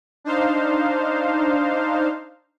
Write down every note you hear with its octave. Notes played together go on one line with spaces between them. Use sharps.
D4 D#4 C5 F5